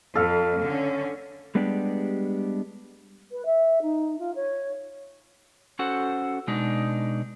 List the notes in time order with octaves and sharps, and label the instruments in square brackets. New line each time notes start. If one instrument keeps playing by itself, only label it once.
[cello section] F2 [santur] A4 F5
[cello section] D3 C#4
[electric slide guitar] G3 G#3 B3 D4 G4
[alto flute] B4
E5
D#4
F4
C#5
[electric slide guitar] C#4 F#4 A4 C5 F#5
B2 G#3 D4 D#4